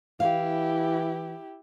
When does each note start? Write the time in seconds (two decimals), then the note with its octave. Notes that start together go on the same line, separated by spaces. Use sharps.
0.20 E3 E4 G4 F5